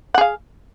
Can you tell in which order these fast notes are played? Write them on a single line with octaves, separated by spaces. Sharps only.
F#5 G#4 F5